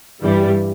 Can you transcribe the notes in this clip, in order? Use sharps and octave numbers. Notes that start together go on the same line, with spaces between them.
G2 E3 G3